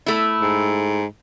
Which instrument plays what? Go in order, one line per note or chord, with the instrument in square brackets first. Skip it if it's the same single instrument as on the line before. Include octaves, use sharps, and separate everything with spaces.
[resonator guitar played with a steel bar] A3 E4
[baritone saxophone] G#2